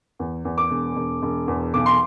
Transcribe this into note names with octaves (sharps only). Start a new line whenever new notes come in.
E2
E2
D6
E1
E1
E1
E2
B1 D6
C6